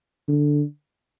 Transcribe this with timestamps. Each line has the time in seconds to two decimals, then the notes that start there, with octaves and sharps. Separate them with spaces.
0.28 D3